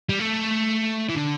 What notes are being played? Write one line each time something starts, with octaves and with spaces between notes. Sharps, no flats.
G3
A3
E3
D3